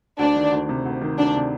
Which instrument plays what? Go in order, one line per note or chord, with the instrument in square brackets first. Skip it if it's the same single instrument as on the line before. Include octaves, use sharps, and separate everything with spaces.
[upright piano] D2 [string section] D4
[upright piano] D#3
D2
C3
D2
D#3
[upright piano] D2 [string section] D4
[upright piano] C3